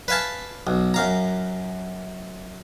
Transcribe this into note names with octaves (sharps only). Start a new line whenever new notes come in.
B4 E5 F5 G#5 A5
B1
F#2 F5 A#5